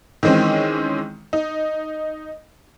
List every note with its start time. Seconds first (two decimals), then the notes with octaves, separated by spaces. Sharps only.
0.23 D#3 E3 G#3 C4 C#4
1.33 D#4